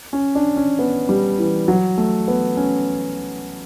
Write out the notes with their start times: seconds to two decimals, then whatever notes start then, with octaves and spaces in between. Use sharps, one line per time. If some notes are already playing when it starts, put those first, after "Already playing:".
0.13 C#4
0.35 D4
0.57 C#4
0.79 B3
1.09 G3
1.39 E3
1.68 F#3
1.98 A3
2.28 B3
2.57 C#4